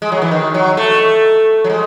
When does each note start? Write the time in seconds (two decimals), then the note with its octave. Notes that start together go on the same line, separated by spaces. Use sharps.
0.02 G#3
0.12 F#3
0.22 E3
0.31 D#3
0.54 F#3
0.77 A3
1.64 F#3
1.70 G#3